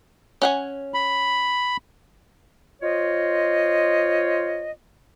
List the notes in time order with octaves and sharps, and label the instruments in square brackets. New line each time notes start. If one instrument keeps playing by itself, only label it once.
[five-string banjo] C#4 F#5 G#5
[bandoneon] B5
[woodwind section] F4 C5 C#5 D#5